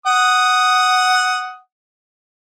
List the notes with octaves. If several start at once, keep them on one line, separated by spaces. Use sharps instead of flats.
F#5 D#6